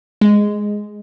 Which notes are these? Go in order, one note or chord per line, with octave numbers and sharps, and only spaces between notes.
G#3